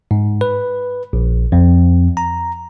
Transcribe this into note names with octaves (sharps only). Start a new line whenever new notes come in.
G#2
B4
A#1
F2
A#5